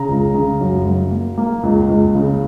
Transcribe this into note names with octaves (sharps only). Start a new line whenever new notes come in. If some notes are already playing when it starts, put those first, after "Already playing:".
Already playing: C#3 A#5
C#2
C#3
F#2
F#2
A#3
A#3
C#2
C#2
C#3